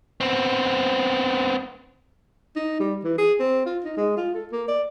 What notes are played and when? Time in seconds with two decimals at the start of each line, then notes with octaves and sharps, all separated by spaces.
0.21 B3 C4
2.56 D#4
2.80 G3
3.04 E3
3.18 G#4
3.40 C4
3.66 F4
3.85 D#4
3.97 G#3
4.17 F4
4.34 A4
4.52 A#3
4.68 D5